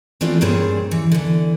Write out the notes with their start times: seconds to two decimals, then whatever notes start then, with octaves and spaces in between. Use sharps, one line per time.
0.21 E3 A3 C4 D4 F4 G4
0.41 G2 A#2 G3 C#4 G#4 C5
0.91 E3
1.12 D3 E3